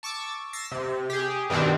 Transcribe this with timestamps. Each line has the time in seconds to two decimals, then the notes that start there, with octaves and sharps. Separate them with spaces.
0.03 A5 C#6 D6 E6
0.53 E6 A6 A#6 C7
0.71 C3
1.10 G4 G#4
1.50 G2 B2 D#3 C4 D4